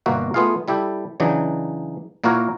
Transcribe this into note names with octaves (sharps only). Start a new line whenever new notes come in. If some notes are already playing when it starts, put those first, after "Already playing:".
G1 B2 A#3 F#4 E5
A3 B3 F4 G#4 F5
G3 E4 G4 A4
C#3 E3 F#3 D4 D#4
A#2 A#3 E4 F#4 A#4 C#5